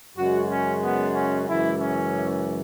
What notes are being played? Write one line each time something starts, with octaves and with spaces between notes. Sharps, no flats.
F#2 C#3 G#3 F#4
C#4
B3
C#4
F#2 C#3 E3 G#3 E4
C#4